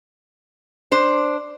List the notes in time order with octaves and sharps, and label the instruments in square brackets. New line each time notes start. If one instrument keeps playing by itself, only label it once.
[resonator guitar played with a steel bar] D4 C5